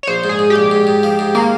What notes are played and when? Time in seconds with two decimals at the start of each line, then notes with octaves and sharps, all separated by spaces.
0.03 C#5
0.08 A#1 C5
0.24 G#2
0.29 G#4
0.39 G#2
0.50 G4
0.56 A#1
0.71 G#2
0.87 G#2
1.03 F3
1.19 G#2
1.35 D#3 A#3